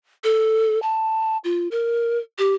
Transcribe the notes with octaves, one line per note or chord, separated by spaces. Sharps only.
A4
A5
F4
A#4
G4